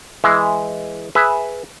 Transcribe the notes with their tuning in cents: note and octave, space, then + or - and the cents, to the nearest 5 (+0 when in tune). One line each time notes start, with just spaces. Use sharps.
E3 +10 G#3 +0 E5 +0
G#4 +0 B4 +0 E5 +0